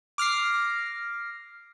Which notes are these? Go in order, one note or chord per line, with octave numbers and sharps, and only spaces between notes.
D6 F6 A#6 C7